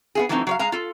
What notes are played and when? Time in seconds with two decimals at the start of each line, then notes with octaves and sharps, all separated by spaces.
0.15 B3 F4 G#4
0.29 E3 F#3 A3 C4 C#4 D#4
0.47 F#3 C#5 F5
0.59 G#3 F5 A#5
0.72 F4 A4